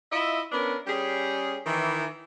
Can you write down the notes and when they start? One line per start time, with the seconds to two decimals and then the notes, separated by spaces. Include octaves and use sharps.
0.12 E4 F4 D#5 E5
0.52 B3 C#4 D4 A#4 B4
0.87 G3 C#4 G4 G#4
1.65 D#3 E3